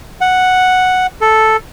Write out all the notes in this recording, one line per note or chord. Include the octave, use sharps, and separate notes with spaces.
F#5
A4